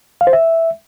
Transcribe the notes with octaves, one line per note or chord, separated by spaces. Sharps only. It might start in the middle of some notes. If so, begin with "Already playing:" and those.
F5
C5
E5